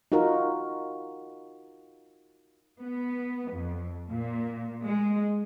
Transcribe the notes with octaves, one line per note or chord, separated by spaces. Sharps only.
D#4 F4 F#4 A#4
B3
F2
A#2
G#3